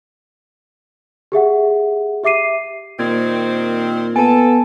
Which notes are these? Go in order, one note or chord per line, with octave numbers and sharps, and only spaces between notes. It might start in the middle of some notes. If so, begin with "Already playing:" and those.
G4 G#4 E5 F#5
G4 E5 D6 C7 D#7
A#2 D#3 G3 C4 G#6
B3 A4 G#5 A5